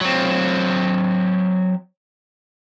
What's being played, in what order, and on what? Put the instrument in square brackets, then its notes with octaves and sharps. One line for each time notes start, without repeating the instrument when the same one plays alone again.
[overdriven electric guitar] F#3 C4